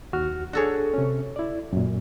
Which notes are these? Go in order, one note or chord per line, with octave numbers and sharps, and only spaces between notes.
D#2 F#4 F6
D4 F#4 G#4 A4 C#5
C3 C#4
E4 D5
F#2 A#2